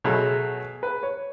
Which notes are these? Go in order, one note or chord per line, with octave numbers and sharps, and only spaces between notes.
B2 F#3 A3 G#4
B4
C#5